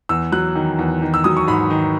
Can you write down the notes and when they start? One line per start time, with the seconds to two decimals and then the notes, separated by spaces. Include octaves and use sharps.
0.09 E2 E6
0.32 F#3 F#6
0.55 D#3
0.79 E2
1.02 D#3
1.14 E6
1.24 F#3 D#6
1.37 C#6
1.47 G#2 B5
1.70 D#3